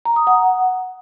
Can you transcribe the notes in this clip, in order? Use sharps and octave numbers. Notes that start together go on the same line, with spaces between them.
A#5
D#6
F#5